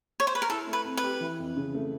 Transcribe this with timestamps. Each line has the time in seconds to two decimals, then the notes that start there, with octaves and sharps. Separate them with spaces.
0.20 C#5
0.27 C5
0.35 B4
0.42 A#4
0.50 E4 A4
0.67 A3
0.73 B4
0.85 C4
0.97 B4
1.04 G4
1.21 E3
1.39 F2
1.57 C#3
1.74 A3